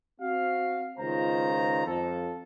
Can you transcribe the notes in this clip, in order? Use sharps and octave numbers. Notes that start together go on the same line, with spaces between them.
C4 F#4 F5
C#2 D#3 F4 C5 A#5
F2 F3 A4